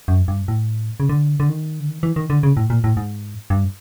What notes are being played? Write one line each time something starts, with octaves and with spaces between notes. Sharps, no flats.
F#2
G2
A2
C#3
D3
D3
D#3
D3
D#3
E3
D#3
D3
C#3
A2
A#2
A2
G#2
G2